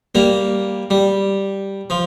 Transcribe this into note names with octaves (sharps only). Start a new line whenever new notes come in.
G3 A#3
G3
F3